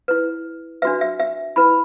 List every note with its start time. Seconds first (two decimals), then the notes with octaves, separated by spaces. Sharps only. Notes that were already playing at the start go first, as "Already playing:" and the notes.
0.08 E4 B4
0.82 D4 F#4 B4 E5
1.01 E5
1.20 E5
1.56 E4 B4 B5